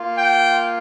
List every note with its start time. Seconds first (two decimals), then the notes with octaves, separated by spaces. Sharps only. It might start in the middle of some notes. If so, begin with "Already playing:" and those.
Already playing: A#3 F4
0.15 G5